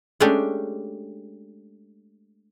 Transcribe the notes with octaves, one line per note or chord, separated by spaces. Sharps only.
G#3 A3 C#4 D4 G4